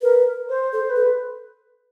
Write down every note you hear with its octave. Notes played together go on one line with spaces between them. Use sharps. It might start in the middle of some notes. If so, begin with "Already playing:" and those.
A#4 B4
C5
A4 C5
B4
A4